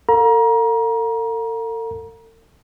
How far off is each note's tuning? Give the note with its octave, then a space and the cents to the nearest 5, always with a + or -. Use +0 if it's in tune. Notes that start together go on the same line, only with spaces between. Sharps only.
A4 +45 F5 +35 A#5 +25